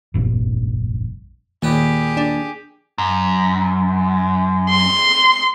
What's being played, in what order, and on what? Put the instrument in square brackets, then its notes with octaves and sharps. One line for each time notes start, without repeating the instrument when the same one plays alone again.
[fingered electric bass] F1 A#1 G2
[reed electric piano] D#2 [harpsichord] A#2 B4 D#6 [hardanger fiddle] G4 G#4
[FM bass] D4
[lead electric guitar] F#2
[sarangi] C6